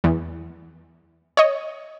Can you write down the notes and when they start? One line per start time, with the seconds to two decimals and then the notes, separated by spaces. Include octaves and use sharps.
0.04 E2
1.37 C#5 D#5